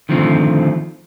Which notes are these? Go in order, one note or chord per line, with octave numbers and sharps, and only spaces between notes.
D3 D#3 F3 A3 C4